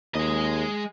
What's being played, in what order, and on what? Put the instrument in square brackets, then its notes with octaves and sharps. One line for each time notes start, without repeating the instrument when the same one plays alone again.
[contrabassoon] D#2 [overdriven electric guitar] G#3 D#5